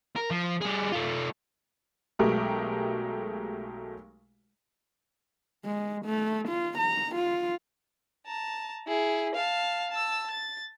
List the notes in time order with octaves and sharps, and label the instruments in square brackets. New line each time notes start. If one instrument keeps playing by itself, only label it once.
[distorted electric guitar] A#4
F3
G3 G#4
A3 F4
[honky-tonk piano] B1 F#3 G#3 A3 G4 A#4
[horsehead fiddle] G#3
A3
F4
A#5
F4
[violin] A5 A#5
E4 G#4
F5 A5
A5 E6
A6